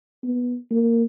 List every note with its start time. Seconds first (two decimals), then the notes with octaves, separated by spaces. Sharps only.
0.23 B3
0.71 A#3